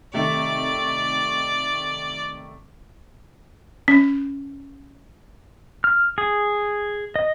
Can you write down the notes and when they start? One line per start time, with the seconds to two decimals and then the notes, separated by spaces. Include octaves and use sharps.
0.14 C3 D#3 A3 D5
3.88 C#4
5.84 F6
6.18 G#4
7.16 D#5